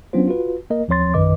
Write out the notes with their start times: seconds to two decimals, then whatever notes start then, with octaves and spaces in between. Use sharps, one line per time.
0.13 F#3 B3 C#4 D4 F4 C5
0.27 F4 F#4 B4
0.70 A#3 A#4 D#5
0.88 D#2 F3 C4 C#5 C6 A6
1.14 A#1 F#2 D#3 B4 D#5 D6